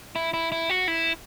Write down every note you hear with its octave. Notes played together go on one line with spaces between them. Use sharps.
E4
E4
E4
F#4
E4